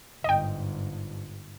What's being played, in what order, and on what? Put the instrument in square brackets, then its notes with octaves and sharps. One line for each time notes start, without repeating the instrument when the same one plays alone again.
[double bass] G1 G#2 [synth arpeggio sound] D#5 G5